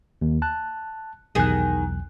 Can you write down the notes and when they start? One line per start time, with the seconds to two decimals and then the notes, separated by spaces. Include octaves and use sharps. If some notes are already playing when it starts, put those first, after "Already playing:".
0.22 D#2
0.42 A5 F#6
1.35 B1 E2 D#3 G#4 F#6